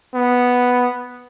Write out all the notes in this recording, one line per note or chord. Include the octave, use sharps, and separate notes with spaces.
B3